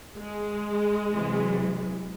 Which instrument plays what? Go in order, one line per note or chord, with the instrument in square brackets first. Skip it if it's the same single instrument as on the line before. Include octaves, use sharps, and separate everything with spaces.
[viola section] G#3
[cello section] C3 E3 F#3